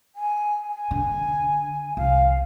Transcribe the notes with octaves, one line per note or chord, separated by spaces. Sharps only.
G#5
G#5
D3
C2 F5